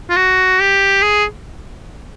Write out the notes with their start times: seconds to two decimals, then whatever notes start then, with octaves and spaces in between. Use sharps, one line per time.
0.09 F4
0.17 F#4
0.60 G4
1.02 G#4